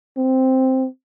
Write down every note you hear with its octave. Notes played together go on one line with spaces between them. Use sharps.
C4